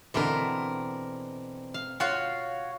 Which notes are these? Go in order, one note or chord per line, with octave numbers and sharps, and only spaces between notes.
B2 D3 E3 C4 A#4
F5
F4 F#4 C#5 F5